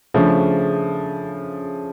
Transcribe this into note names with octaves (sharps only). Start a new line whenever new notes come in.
C#3 F3 A3 D4